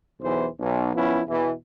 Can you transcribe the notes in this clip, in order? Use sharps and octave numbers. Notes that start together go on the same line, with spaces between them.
B1 E2 E3 C5
B1
F3 B3 C#4 E4
E2 B2 E3